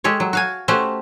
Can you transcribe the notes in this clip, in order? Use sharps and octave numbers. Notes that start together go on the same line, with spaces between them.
G#3 G4 A4 C#5
F#3
F#4 F5 G#5
A3 C#4 F#4 G4 C5